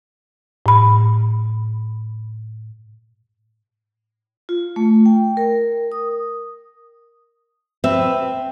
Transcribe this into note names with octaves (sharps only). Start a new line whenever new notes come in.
A2 B5
F4
A3
G5
A#4
D#6
C4 B4 E5